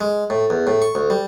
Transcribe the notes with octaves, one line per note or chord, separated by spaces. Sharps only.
G#3
A2
E2
A2
C#6
D2
G3